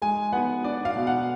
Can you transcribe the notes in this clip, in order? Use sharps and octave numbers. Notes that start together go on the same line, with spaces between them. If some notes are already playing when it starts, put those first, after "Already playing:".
G#3 G#5
B3 F#5
D4 D5
F5
B2
F#5